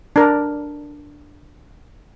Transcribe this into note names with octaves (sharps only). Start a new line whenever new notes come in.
D4 A#4